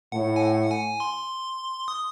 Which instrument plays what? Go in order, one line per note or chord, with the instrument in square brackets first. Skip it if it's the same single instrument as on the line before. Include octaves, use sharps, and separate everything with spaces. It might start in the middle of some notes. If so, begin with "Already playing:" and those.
[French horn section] A2 [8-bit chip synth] F#5
[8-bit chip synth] G#5
F#5
F#5
G#5
C6
D#6